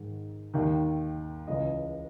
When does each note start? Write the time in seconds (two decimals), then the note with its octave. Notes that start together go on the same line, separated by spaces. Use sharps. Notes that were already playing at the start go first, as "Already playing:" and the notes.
Already playing: G#2 D#3
0.54 D#2 D#3
1.47 C#2 C#3 E3 D#5